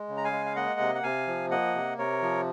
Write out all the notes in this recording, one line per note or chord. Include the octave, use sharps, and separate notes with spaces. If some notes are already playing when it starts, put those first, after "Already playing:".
Already playing: G#3
C#3
A#5
F5 G#5
G#3
F5
A#3 D#5 F#5
C3
F#5
C3 F5 G#5
F3
A#3 D#5 F#5
C3
C3 A#4 C#5
F3